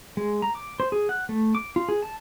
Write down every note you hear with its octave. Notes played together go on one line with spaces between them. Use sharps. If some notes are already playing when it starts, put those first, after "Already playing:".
G#3
A#5
D6
C5
G#4
F#5
A3
D6
F4
G#4
A5